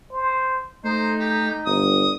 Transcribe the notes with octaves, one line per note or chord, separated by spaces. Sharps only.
C5
A3 D#4 C5
G4
G1 D#6